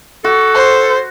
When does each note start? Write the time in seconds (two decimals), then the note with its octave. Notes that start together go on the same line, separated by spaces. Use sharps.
0.24 F#4 A4
0.54 C5